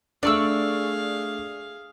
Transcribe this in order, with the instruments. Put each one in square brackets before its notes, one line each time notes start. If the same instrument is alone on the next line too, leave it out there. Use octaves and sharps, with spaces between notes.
[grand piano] A3 D4 [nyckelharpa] G#4 F5 [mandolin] D5 C#6 E6